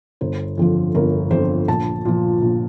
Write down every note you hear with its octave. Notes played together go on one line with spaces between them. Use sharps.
G1 C5
F2 D3 F3
G1 A#4
F2 D3 F3 C5
A#1 A5
A#2 F3
A#1